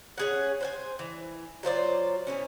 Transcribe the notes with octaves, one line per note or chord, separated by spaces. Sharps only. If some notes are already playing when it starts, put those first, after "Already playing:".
C#4 G#4 F#5
C5 F#5 G#5
E3
F#3 F4 C5 D5
B2 E3 C#4